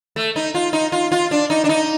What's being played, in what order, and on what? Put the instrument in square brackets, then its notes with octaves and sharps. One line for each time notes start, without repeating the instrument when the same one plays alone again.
[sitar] A3
D#4
F4
D#4
F4
F4
D4
D#4
D4
D#4